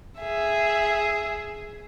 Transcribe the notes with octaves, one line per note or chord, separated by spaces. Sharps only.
G#4 E5